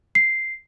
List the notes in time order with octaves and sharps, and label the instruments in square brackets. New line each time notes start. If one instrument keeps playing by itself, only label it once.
[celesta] C7